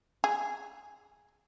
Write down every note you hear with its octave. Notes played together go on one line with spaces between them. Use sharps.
G#4